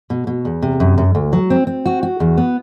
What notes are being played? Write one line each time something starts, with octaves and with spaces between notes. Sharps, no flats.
B2
B2
E2
C3
F#2
F#2
D2
F#3
C4
C4
F#4
F#4
E2
B3